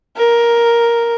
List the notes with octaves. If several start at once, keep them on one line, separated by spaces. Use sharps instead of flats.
A#4